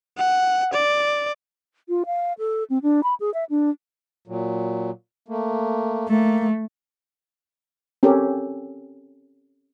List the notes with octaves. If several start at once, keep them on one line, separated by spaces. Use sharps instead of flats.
F#5
D5
F4
F5
A4
C4
D4
B5
G#4
E5
D4
A#2 F#3
A3 A#3
A3 A#3
C4 C#4 G4 A4 A#4